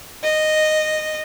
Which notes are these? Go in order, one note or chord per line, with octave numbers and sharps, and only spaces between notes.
D#5